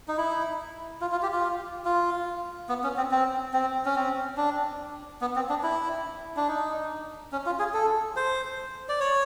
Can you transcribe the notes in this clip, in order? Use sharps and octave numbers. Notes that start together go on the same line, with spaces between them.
D#4
E4
F4
F4
G4
F4
F4
B3
C#4
C4
C4
C4
C#4
C4
D4
B3
C4
D4
E4
D4
D#4
C#4
F4
G#4
A4
C5
D5
C#5